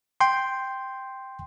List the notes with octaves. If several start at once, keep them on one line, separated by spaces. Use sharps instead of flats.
G5 C6